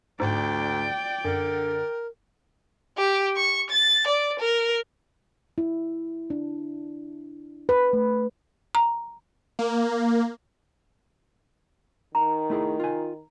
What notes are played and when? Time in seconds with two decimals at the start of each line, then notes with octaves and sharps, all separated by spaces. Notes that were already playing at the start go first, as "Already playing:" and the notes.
0.20 D2 G#2 D5 G5
1.25 F#2 D3 A#4
2.97 G4
3.36 C#6
3.70 A6
4.07 D5
4.39 A#4
5.58 E4
6.30 D4
7.69 B4
7.93 A3
8.75 A#5
9.59 A#3
12.15 D#3 A#5
12.50 A3 E4 G#4
12.80 F4 G#5